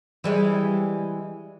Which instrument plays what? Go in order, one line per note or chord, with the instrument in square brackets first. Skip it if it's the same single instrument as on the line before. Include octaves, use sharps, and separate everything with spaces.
[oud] E3 G3 G#3